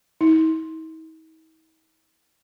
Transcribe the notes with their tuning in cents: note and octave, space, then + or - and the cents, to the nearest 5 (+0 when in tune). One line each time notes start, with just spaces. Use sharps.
D#4 +45